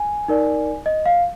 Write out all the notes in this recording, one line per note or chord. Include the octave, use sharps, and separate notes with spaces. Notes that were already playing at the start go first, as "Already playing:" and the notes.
Already playing: G#5
D#4 A#4 D5
D#5
F5